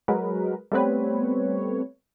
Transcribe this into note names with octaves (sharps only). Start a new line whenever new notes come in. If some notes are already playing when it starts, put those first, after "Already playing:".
F#3 G#3 F#4 G#4 A#4 B4
G3 A3 B3 C4 B4 C#5